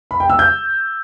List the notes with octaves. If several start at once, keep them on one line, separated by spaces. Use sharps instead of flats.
B5
G5
E6
G6